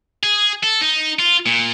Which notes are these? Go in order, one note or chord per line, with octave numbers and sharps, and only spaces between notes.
G#4
A4
D#4
F4
A#2